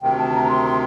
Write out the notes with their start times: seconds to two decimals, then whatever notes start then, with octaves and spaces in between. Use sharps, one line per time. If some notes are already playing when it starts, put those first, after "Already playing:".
0.02 D2 C3 D#3 G5
0.18 A5
0.33 A#5
0.48 C6
0.63 C6